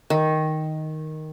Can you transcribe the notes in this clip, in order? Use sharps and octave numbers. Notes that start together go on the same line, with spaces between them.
D#3